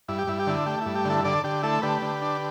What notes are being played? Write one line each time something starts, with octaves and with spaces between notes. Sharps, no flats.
G2 E4
G4
G2 E4
G4
D3 E4
A3 G4
G2 E4
G4
D3 E4 A4
D3 A4 D5
D3 G4
A3 E4 A4
D3 G4 B4
D3
D4